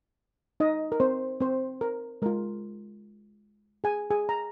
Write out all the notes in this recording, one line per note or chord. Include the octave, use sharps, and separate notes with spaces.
D#4 D#5
A#4
C4 C5
C4 C5
A#4
G#3 F4 A#4
G#4 G#5
G#4 G#5
A#5